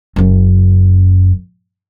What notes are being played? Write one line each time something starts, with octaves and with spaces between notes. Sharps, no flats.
F#1 F#2